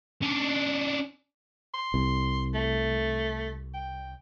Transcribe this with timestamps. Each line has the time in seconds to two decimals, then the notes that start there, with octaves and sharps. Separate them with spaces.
0.22 C#4 D4
1.74 C6
1.94 C2
2.54 A3
3.74 G5